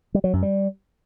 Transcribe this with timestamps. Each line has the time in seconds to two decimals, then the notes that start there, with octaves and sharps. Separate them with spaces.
0.14 G3
0.24 F#3
0.33 F#2
0.43 G3